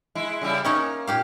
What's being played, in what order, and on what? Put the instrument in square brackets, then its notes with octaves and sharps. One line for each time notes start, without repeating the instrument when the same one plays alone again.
[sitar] G#3 E4
C#3 G3 E4
[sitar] A#3 [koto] C#4 D#4 C#5
[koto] A#2 G4 F5